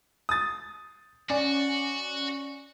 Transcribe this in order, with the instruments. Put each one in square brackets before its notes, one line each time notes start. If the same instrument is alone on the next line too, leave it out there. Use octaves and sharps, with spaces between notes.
[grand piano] D#6 A6
[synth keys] C#4 [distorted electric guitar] F#4 [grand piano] D5